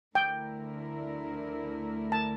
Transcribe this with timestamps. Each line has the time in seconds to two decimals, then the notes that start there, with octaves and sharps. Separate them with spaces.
0.15 D2 D3 A3 E4 A#4 G5
2.12 A5